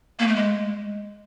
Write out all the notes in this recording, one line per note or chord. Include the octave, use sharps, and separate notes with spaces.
A#3
A3
G#3